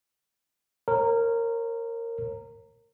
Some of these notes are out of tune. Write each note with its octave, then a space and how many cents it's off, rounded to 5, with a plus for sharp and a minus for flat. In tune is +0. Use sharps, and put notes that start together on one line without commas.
A#4 -15 C#5 -40